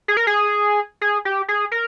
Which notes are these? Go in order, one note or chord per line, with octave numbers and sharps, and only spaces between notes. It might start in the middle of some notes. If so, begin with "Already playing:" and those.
G#4
A#4
G#4
G#4
G4
G#4
A#4